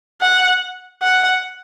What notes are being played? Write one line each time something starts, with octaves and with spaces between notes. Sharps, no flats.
F#5
F#5